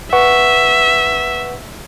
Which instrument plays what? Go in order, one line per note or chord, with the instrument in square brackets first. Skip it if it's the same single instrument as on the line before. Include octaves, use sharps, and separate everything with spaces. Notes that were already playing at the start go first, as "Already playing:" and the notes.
[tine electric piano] B4 F#5 C#6 [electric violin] E5